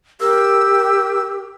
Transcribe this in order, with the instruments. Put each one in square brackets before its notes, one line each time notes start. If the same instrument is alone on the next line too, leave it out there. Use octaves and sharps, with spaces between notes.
[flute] G4 [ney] A#4 [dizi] E6